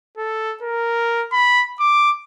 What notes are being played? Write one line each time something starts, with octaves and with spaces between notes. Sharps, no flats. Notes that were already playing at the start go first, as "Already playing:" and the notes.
A4
A#4
B5
D6